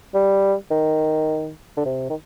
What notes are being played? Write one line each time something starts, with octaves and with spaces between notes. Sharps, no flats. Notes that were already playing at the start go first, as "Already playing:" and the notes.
G3
D#3
D3
C3
D#3